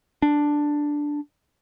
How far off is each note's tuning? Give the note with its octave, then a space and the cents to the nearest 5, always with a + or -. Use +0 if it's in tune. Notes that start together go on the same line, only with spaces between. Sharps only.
D4 +0